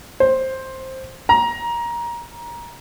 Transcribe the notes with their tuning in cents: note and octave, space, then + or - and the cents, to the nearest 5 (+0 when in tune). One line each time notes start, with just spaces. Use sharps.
C5 +10
A#5 +20